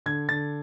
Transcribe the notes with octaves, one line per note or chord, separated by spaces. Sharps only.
D3 G#6
D3 A6